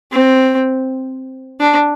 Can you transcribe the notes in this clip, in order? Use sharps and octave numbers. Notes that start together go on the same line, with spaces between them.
C4
D4